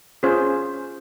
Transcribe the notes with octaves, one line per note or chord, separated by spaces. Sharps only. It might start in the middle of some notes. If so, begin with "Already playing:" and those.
C#4 F4 G#4 C5